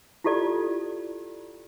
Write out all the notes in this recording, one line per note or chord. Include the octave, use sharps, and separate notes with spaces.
E4 F4 G4 A4 D5